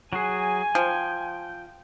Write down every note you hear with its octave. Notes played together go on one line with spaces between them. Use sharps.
F#3 F#4 G#4 G#5
F3 G5